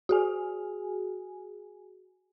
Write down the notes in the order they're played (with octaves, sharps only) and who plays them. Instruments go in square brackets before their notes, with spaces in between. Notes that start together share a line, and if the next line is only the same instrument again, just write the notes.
[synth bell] F#4 G#4 G#5